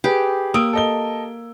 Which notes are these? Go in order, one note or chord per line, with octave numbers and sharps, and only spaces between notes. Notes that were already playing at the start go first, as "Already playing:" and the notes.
G4 G#4 B4
A#3 D#6 E6 D7
A4 D#5 G7